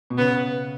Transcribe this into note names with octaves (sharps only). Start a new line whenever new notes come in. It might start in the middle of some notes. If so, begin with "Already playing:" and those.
B2
C#3 B3